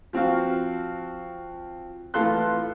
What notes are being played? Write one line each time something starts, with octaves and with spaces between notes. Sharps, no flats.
F3 C4 F#4 F5
A2 E3 F4 A4 C6 F#6